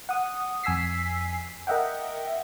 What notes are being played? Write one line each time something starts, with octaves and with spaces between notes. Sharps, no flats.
F#5 D#6
F2 G#5 E6 B6 C7
A#4 D#5 E5 F#5 G5